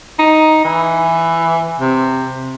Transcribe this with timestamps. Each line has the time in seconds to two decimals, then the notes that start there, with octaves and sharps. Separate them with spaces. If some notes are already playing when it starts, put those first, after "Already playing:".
0.19 D#4
0.65 E3
1.80 C3